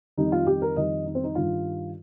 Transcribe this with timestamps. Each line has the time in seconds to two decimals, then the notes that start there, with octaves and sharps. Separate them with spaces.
0.18 F2 D#3 G3 D#4
0.32 F4
0.47 G4
0.62 A#4
0.76 F2 D#3 G3 D#5
1.05 D#4
1.15 C4
1.24 D#4
1.35 G2 D#3 G3 F4